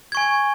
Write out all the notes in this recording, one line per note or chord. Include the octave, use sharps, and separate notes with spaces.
G#5 C#6 G#6